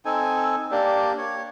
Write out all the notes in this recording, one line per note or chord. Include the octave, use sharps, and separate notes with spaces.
C4 D#4 A4 G#5
A#3 D4 G4 D5
C#5